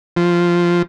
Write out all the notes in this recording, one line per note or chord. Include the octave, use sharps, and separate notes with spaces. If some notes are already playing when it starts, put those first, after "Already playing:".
F3